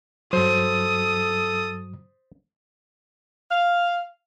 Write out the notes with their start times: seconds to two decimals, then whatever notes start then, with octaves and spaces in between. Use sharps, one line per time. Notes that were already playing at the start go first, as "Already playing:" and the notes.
0.33 G2 F#3 A4 C5 D#6
3.51 F5